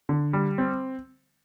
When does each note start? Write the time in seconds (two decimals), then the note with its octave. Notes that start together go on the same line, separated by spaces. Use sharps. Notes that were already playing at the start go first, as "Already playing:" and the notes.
0.09 D3
0.33 G3
0.58 C4